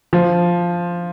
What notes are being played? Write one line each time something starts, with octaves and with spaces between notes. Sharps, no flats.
F3